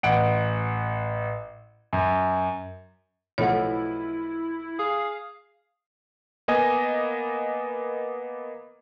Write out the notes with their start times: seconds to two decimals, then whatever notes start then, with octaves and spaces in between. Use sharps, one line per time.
0.03 A1 F#5 D7
1.93 F#2
3.38 B1 F3 A3 E4 C#5 F#5
4.79 G#4 F5
6.48 A#3 B3 D#5 G#5